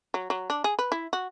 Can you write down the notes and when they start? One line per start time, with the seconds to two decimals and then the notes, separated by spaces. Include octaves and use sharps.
0.14 F#3
0.30 F#3
0.50 D4
0.64 G#4
0.79 B4
0.92 E4
1.13 F#4